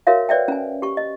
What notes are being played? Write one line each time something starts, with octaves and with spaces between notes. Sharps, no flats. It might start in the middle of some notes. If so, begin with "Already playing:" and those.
F#4 A#4 C#5 E5 F5
B4 C#5 D5 E5 G5
C#4 G#5
G4 C#6
D#5